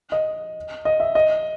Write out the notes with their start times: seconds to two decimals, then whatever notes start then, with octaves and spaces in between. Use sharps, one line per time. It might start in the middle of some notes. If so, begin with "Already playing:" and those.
0.12 D#5
0.85 D#5
1.00 E5
1.15 D#5